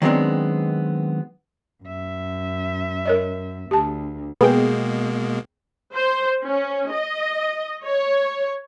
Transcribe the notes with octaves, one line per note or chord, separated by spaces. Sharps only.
D#3 F#3 G#3 B3 C4 D4
F#2 E5
A#4 C#5 D#5
D2 G4 A5
B2 G#3 A#3 B3 G#4 G5
C5
C#4
D#5
C#5